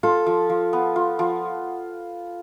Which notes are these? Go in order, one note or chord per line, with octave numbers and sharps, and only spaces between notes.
F4 A4
F3
F3
B3
F4
F3